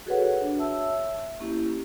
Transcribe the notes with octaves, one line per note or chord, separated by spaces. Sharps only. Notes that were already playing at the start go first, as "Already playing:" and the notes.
F#4 G#4 A4 B4 C#5 F#5
D4
C#5 E5 A5 E6
A#3 C#4 E4 G4